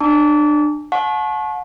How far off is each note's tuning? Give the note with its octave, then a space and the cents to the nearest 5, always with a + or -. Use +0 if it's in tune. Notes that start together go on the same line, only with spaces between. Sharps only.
D4 +30 A5 +30 D6 -35
F#5 -35 A5 -35 C#6 -30